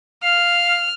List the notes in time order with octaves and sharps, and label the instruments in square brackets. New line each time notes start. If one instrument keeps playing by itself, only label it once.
[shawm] F5 [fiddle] F6